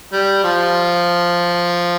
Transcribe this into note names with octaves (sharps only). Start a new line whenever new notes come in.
G3
F3